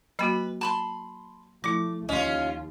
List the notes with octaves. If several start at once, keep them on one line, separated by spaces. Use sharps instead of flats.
F#3 A#3 F#4 B4 B5
A5 B5 C6
F3 A3 E4 D6
D#2 C#4 F4 D#5